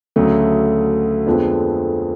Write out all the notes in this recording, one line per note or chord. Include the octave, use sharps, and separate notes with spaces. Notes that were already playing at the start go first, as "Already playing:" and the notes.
D2 C#3 F#3 A3
F2 D3 F3 G#3 B3